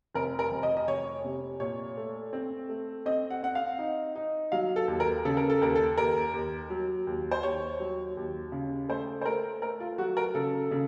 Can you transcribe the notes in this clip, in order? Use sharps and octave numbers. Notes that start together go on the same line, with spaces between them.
F1 A#4
A#4
F1
D#5
D#5
F1 C#5
C3
A#2 C#5
A3
C4
A3
C4 D#5
F#5
C4 F#5
F5
D#4
D#4
F#3 F5
A4
D#2
A#4
C#3 A4
A#4
A4
D#2 A#4
A4
D#2 A#4
D#2
F#3
D#2
C5
D#2 C#5
F#3
D#2
C#3
A3 C5
C5
A3 A#4
A3 A#4
F4
F#3 F#4
A#4
C#3 A4
C#3